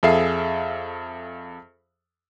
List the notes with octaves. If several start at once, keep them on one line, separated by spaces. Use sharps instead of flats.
F2 G#4 A4 E5 F5 C7